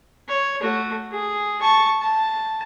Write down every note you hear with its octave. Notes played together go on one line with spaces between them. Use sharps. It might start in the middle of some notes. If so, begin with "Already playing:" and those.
C#5
A3 F#4
G#4
A5 C#6
A5